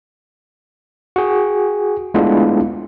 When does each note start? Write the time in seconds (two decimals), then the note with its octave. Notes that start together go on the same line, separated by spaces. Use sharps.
1.16 F#4 G#4
2.14 G#3 A3 B3 D4 E4 F4